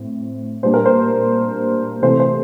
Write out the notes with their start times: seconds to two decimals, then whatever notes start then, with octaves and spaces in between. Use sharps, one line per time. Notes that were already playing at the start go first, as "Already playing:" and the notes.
Already playing: A2 C4
0.63 A#2 G3 D4 C5
0.74 A#4
0.85 C5
2.02 C3 E3 A3 C5
2.20 C5